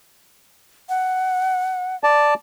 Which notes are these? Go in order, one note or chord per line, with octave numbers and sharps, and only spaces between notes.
F#5
D5 A5